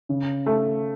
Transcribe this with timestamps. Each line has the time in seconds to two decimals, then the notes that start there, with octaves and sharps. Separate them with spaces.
0.09 C#3
0.46 A3